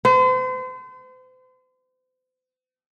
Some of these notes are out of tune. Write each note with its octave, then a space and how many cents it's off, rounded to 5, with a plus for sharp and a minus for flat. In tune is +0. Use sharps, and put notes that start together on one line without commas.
C5 -40